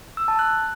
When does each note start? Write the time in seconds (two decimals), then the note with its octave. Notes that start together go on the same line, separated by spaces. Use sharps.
0.17 E6
0.28 A5
0.39 F#6